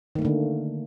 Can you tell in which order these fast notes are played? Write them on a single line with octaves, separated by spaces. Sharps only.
D#3 A3 A#3 D3